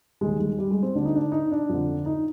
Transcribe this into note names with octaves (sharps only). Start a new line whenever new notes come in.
D#2 D#3 G#3
G#3
G3
G#3
C4
D2 D3 D4
D#4
D4
D#4
D4
F2 D3
D#4